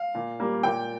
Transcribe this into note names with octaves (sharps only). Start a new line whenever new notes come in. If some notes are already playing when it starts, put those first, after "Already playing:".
Already playing: F5
A#2
G3 A#3
A#2 G5